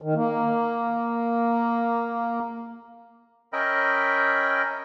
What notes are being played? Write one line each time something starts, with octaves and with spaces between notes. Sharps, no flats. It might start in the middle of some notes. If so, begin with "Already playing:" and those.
D#3
A#3
C#4 A#4 D#5 E5 G5 B5